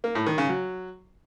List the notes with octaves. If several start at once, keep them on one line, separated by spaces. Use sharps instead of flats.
A#3
A2
D#3
C#3
F#3